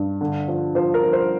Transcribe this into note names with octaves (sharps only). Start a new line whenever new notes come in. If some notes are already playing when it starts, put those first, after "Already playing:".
Already playing: G2
D3
F3
F3 C5
A#4
F3
C5